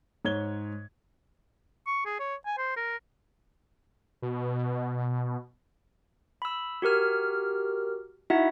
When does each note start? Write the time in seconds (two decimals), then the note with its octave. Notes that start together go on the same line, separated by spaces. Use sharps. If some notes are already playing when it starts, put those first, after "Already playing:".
0.25 G#2 C#5 G#6 G7
1.87 C#6
2.06 G#4
2.20 C#5
2.46 G#5
2.58 C5
2.77 A#4
4.22 B2
6.42 B5 E6
6.82 F#4 G4 A#4 F6
8.30 D#4 E4 F#4 E5 F#5